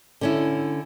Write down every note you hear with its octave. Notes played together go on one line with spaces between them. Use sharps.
D3 C#4 E4